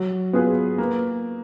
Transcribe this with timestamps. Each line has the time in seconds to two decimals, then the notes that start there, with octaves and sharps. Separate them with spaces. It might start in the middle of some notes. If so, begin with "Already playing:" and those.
Already playing: F#3
0.33 B3 F4 G#4 B4
0.78 A#3